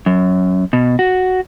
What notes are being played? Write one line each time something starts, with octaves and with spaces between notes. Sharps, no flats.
F#2
B2
F#4